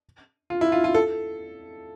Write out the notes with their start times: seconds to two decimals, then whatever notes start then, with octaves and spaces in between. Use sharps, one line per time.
0.50 F4
0.61 E4
0.72 F4
0.84 F4
0.95 A4